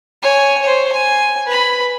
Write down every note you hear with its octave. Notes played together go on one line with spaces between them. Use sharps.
C#5 G#5
C5 C#5
G#5
B4 B5